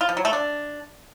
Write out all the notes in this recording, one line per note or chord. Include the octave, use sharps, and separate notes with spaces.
F4
F3
F#3
A3
D4